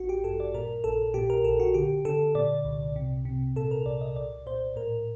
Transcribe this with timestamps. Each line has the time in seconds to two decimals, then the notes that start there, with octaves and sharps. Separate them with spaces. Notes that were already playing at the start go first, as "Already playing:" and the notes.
Already playing: A1 F#4
0.09 G4
0.24 G2 A4
0.40 D5
0.54 A#2 A#4
0.84 A#1 A4
1.14 A#2 G4
1.30 A#4
1.44 A#1 A4
1.60 F#4
1.74 D3 G4
2.05 D3 A4
2.35 A#2 D5
2.65 C2
2.96 C3
3.25 C3
3.56 A#2 A4
3.71 A#4
3.86 C2 D5
4.01 D#5
4.16 C2 D5
4.46 A#2 C5
4.76 A2 A#4